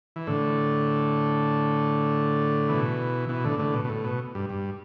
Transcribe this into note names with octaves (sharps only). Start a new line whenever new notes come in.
E3
A2 D3
B2 E3
B2 E3
A2 D3
A2 D3
B2
B2
A2
B2
G2
G2